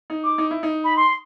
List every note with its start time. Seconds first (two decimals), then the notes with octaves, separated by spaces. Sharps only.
0.10 D#4
0.23 D6
0.38 D#4
0.51 E4
0.63 D#4
0.84 B5
0.96 C6